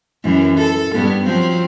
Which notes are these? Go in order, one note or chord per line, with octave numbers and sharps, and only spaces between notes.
F#2 E3
A4
G2 B3
F3 F#3 C4